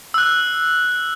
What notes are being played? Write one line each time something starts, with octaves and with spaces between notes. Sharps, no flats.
E6 F#6